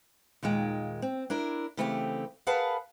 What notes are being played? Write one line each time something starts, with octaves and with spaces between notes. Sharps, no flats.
D#2 A#2 D#3 G#3 G5
C4
D4 E4 A#4
C#3 E3 A3 C4 F#4 G4
G#4 A#4 B4 F5 F#5 A5